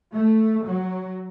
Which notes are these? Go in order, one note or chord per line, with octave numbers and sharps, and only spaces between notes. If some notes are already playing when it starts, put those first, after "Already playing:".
A3
F#3